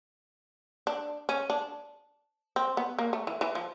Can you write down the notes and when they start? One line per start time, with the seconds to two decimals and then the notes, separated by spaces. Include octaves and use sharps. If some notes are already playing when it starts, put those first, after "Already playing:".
0.87 D4
1.29 C#4
1.50 D4
2.56 C4
2.77 B3
2.99 A#3
3.13 A3
3.27 E3
3.41 E3
3.55 F3